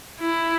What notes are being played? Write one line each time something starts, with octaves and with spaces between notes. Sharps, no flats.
E4